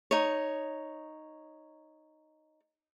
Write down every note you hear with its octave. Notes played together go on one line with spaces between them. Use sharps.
D#4 C#5